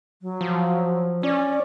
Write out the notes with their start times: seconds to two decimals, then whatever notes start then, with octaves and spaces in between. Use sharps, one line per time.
0.22 F#3
0.41 F3
1.23 C#4 D5